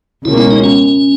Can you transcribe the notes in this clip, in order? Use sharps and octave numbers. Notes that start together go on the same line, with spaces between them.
C#2 B2 A#3 C#4 E4
E4
D#4
C#4